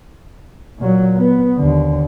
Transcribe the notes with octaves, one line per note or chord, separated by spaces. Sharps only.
A#2 F#3
B3
D#2 D3